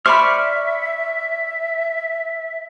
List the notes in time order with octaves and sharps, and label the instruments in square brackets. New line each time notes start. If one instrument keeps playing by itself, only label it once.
[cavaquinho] C5 D5 B5 [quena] E5 [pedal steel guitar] C#6 F6